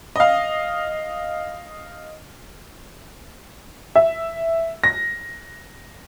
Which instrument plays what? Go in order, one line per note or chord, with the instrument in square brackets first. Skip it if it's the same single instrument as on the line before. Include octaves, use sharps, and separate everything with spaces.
[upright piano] D#5 F5
E5
A#6